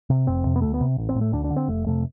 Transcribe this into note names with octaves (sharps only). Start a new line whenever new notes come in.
C3
F1 C4
F2 C3
B3
D2 A3
B3
C3
A1
C4
A2
A3
D2 D4
D4
D3
C4
F1 A3
F2 C3 A3